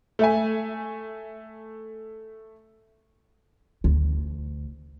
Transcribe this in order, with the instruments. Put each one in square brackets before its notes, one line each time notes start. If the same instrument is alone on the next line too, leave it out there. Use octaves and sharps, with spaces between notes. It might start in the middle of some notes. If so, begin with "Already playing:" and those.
[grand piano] A3 E5 G#5
[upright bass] D2